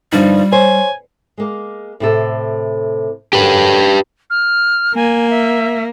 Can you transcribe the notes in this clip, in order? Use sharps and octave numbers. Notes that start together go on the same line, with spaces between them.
G2 D3 F3 G3 D4 D#4
C5 C#5 G#5
G#3 A#3
A2 C3 A4
F#2 D3 F#4 G4 B4
F6
A#3 G#5
E5